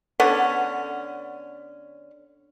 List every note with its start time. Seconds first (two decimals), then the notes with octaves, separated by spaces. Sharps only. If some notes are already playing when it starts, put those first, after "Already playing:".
0.20 D3 B3 C#4 F#5